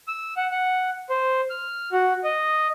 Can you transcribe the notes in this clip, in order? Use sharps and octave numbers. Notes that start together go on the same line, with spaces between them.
E6
F#5
F#5
C5
F6
F#4
D#5